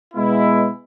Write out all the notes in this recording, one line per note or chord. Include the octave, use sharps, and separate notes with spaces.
B2 G#3 B3 E4